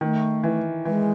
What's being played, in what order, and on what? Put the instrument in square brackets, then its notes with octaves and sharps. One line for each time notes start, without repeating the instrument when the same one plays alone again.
[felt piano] D#3 [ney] A3
[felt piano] E3
[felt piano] E3 [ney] G#3